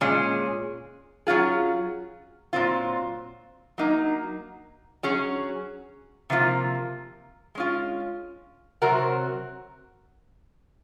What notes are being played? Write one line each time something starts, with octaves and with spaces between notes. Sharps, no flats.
A#2 G#3 C#4 G#4
F#3 C#4 F4 G#4
A#2 F#3 C4 F4
F#3 A#3 D#4
F#3 C#4 G#4
C3 F3 A#3 F4
G#3 C#4 F4
C3 F#3 C4 F#4 A#4